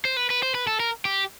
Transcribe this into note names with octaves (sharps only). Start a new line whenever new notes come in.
C5
B4
B4
C5
B4
A4
A#4
G4